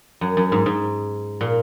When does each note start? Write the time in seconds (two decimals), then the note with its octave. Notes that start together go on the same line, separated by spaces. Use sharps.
0.21 F#2
0.37 F#2
0.52 G#2
0.66 G#2
1.41 A#2